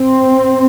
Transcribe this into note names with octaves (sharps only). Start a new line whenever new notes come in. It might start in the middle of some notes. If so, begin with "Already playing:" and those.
Already playing: C4